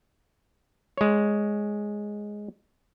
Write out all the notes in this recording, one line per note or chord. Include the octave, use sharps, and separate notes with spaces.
G#3 C#5